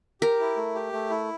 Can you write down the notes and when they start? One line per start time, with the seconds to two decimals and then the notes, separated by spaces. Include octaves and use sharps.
0.21 G4 A#4
0.40 E4
0.57 A3
0.75 G4
0.93 A3
1.10 E4